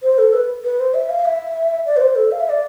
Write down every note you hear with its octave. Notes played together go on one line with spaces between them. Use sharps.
C5
A4
B4
B4
C5
E5
F5
E5
D5
B4
C5
A4
F5
E5
D5